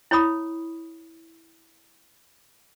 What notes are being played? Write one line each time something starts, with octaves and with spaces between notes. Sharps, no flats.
E4 C#5 B5 D#6